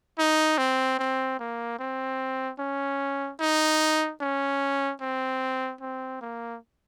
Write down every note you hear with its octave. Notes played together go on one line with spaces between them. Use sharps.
D#4
C4
C4
A#3
C4
C#4
D#4
C#4
C4
C4
A#3